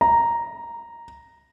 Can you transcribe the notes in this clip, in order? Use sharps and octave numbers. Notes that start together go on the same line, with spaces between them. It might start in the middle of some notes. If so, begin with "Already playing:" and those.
A#5